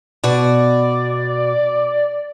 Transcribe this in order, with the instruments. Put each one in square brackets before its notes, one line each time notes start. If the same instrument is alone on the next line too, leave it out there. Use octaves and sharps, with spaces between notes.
[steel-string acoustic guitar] B2 F#4 D#5 [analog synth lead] D5